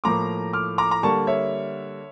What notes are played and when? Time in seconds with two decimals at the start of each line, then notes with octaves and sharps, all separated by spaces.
0.04 A2 F3 A#3 A#5 D6
0.53 D6 F6
0.78 A#5 D6
0.91 A#5
1.03 D3 G3 A#3 A5 C#6
1.27 C#5 E5